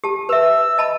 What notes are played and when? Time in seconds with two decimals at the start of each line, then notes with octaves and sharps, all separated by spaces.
0.04 G4 A5
0.29 B4 E5 E6
0.78 D#5 A5 B5